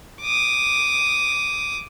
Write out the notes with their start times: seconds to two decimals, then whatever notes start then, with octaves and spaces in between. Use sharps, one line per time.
0.21 D6 D#6